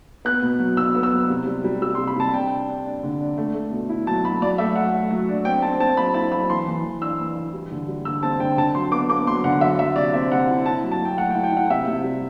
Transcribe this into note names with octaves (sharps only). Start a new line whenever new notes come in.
B3 F#6
B2
F#3
B2 E6
B3
E6
F#3
C3
G3
G3
G3 E6
C6
C3
B5
C3 A5
D4 G5
D4
D4
D4
D3
D4
A3
A3
B2
E4
F#3 A5
F#3 B5
F#3 D5
A3 E5
F#3 F#5
A3
F#3
D4
C4 G5
C4 A5
C4 A5
F#3 B5
E4 A5
F#3 B5
E3 C6
E3
E3
D4 E6
E3
E3
G3
D3
G3
D3 E6
C4 A5
D3 G5
D3 A5
F#3 C6
B3 D6
B3 D6
F#3 C6
D3 F#5
F#3 E5
F#3 E5
C3 D5
C4 E5
C3 F#5
E4
E4 A5
F#3
A5
F#3 G5
A3 F#5
G5
E4
G5
E4 F#5
C3 E5
C3
G3